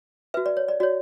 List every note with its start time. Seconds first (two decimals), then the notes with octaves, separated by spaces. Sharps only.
0.34 F#4 B4 E5
0.46 D5
0.57 C#5
0.68 D5
0.80 F#4 C#5 D5